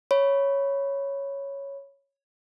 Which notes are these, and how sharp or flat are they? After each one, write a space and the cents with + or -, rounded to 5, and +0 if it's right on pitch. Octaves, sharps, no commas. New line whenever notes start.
C#5 +0 B5 +0